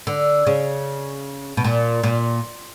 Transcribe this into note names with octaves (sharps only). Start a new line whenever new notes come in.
D3
C#3
B2
A#2
A#2